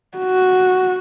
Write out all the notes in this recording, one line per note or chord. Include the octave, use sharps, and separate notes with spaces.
F#4